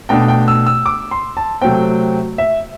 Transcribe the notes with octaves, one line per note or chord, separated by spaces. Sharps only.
B2 A3 D4 G5
G5
E6
E6
D6
C6
A5
C3 F#3 A3 C4 G5
E5